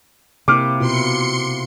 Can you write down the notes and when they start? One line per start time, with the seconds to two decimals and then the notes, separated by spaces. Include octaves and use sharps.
0.48 C3 A#3 E4 D6 F6
0.80 B2 E4 F4 C6 C#7